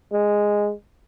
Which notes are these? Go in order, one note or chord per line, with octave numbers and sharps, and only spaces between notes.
G#3